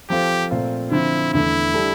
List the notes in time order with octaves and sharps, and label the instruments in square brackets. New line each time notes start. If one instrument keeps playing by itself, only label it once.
[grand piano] F3 C4 F4 A4 [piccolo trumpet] G4
[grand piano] A#2 A3 C4 F4 C5
[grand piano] D3 F3 C4 [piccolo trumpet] E4
[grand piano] E2 D3 A3 [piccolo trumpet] E4
[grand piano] G3 D4 A4